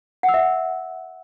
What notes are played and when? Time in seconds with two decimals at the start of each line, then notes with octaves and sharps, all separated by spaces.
0.23 F#5
0.29 E6
0.34 E5